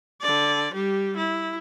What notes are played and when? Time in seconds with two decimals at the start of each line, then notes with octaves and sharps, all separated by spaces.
0.22 D3 D5
0.73 G3 G4
1.17 E4